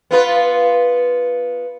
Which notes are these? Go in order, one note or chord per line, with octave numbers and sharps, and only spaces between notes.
B3 F4 B4